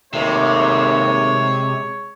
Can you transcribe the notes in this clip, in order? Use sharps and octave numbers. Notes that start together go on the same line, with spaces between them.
G#1 D#2 C3 G#3 A3 C#5